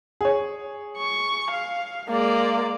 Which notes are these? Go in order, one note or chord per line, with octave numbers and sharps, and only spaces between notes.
G#4 C#5
C#6
F5
G#3 A#3 D5